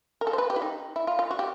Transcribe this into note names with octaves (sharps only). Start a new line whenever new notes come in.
A#4
A4
C5
B4
G4
E4
D#4
E4
F4
F4
F#4
G4